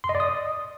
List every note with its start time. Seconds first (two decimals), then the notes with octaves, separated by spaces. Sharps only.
0.04 C6
0.09 D#5
0.15 D5
0.20 D#6